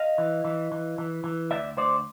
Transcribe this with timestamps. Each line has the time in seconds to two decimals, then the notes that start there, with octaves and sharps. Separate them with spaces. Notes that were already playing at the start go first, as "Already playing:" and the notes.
Already playing: D#5 F5
0.18 E3
0.45 E3
0.72 E3
0.98 E3
1.24 E3
1.51 D2 D5 E5
1.77 D2 C5 D5